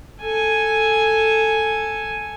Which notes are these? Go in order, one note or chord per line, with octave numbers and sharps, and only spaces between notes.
A4 G#5